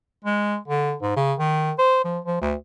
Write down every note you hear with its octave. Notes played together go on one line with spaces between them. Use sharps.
G#3
D3
G#2
C#3
D#3
C5
F3
F3
D2